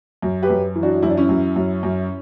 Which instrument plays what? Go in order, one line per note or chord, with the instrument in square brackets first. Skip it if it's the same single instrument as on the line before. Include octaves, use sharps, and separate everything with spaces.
[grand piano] F#2
G4 B4
F#2
E3
D4 F#4
F#2 E4
D4
C#4 E4
F#2
F#2
F#2